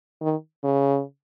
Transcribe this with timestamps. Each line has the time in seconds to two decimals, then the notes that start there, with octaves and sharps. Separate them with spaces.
0.21 D#3
0.64 C#3